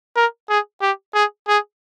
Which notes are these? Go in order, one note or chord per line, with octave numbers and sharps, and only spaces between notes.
A#4
G#4
G4
G#4
G#4